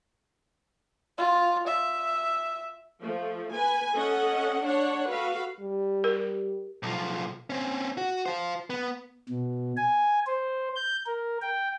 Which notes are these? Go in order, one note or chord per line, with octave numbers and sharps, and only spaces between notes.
F4
E5
F3 A3
B4 G#5
C#4 A4 D#5 F#5
D4 C#5 F#5
F#4 A4 B4 F5
G3
G4 A#4
B1 F3
C4 C#4
F#4
F4 C5
B3
B2
G#5
C5
G6
A#4
G5